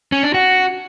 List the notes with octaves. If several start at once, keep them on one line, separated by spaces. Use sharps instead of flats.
C#4
D4
F#4